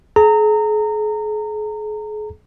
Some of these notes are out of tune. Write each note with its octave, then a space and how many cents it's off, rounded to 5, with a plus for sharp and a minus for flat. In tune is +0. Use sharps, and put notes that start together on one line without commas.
G#4 +40 A#5 -25